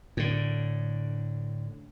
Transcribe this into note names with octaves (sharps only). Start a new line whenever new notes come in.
A2 D3